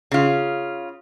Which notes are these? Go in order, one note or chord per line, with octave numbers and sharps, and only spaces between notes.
C#3 F4